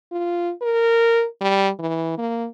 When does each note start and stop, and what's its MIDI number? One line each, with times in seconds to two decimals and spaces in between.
0.12 0.52 65
0.62 1.25 70
1.41 1.69 55
1.79 2.14 52
2.18 2.47 58